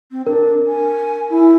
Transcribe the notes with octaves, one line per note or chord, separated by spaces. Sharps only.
C4
D4 A#4
G#5
E4